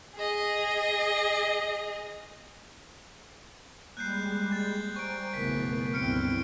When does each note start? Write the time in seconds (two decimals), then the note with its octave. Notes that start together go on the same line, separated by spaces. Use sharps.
0.17 G#4 D#5
3.97 G3 G#3 A#3 B5 F#6 G6 C7
4.51 G6 A6
4.96 G3 C5 G#5 A#5 C#6 D7
5.34 F#1 B1 E3 A3 B3 A#4 B6
5.94 G1 C#2 B3 C4 E4 F6 C#7 D7